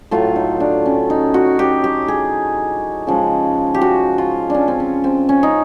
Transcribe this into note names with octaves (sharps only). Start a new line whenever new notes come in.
A2 F#3 A3 F4
D#4
D4
C#4
D#4
F#4
G4
G4
G#4
C#3 F3 G#3
G4
F#4
F4
C#4 D4
C4
C#4
C4
C#4
D#4